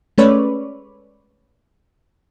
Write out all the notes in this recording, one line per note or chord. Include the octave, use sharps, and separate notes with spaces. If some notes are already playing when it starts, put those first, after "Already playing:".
G#3 A3 C#4 B4 C#5 D5